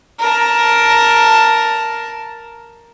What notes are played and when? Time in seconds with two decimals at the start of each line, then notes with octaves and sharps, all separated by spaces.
0.20 A#4 A5